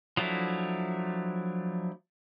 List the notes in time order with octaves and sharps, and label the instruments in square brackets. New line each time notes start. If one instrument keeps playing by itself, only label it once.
[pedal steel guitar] F3 F#3 A3 D4 E4